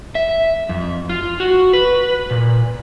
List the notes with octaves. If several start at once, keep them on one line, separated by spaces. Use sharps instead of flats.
E5
F2
F4
F#4
B4
A#2